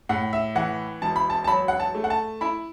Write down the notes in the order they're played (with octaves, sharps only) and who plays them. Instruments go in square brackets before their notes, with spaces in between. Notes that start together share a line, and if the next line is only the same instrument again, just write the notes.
[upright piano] A2 F#5
E5
E3 F#5
E1 A5
B5
A5
A5
F#3 B5
F#5
A5
A3
F#5
A5
E4 B5